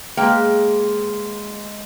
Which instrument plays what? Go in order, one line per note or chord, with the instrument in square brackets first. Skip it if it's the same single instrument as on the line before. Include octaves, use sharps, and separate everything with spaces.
[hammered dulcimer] G#3 [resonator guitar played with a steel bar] A#3 B4 G5